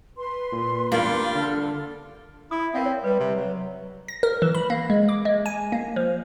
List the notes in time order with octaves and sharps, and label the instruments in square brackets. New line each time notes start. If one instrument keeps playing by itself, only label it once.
[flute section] B4 C6
[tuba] A#2
[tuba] E2 [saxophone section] G3 D4 F4 [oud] A#3
[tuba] D3 [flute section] A4 F6
[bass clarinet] E4 [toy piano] D#6
[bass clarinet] C4 [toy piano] A#4 E5 F5
[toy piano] C#5
[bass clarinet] G3 [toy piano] B4
[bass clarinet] C3
F#3
[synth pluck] A#6
A#4
E3
B5
A#3
G#3
D6
G#3
G#5
A#3
F3